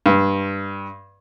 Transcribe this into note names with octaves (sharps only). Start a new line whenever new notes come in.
G2